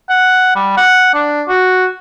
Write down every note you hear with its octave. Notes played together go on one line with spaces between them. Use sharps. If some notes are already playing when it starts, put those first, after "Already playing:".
F#5
G3
F#5
D4
F#4